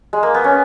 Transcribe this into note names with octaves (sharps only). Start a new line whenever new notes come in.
G#3
A#3
B3
C#4